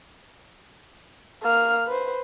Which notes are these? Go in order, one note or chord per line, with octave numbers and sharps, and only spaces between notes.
A#3 F6
B4 C5